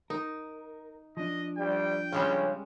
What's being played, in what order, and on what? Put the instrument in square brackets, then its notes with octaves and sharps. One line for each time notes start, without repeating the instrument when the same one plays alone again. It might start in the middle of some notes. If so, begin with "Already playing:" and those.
[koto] D#4 [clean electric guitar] A#4
[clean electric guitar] F3 D4 [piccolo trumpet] D#5
[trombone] G3 [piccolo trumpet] G5
[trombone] C#3 [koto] G3 G#3 C#4